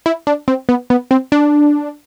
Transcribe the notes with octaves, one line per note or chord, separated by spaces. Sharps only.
E4
D4
C4
B3
B3
C4
D4